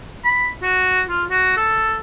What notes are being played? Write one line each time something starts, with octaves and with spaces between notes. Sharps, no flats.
B5
F#4
F4
F#4
A4